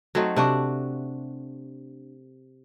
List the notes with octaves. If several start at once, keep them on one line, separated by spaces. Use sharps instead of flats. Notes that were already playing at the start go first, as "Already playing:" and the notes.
F#3 A3 C4 D#4
C3 D4 F#4